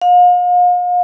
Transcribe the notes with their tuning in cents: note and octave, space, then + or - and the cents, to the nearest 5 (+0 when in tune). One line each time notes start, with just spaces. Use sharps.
F5 +40